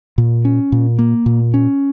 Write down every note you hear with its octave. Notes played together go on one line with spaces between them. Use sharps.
A#2
C#4
A#2
A#3
A#2
C#4